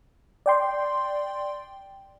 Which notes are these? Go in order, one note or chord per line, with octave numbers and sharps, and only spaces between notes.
D5 G5 C6